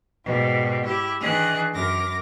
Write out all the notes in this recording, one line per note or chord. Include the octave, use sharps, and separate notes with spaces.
G#2 B2 G3
E4 G4
D#3 E3 D4 G#4 F#6
F#2 A#4 D6 A#6